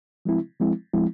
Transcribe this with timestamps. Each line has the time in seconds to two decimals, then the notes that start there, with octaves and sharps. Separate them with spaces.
0.25 F3 G#3 C4 E4
0.60 F3 G#3 C4 E4
0.93 F3 G#3 C4 E4